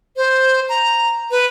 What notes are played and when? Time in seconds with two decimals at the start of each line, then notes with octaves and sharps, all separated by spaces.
0.17 C5
0.69 A#5
1.31 B4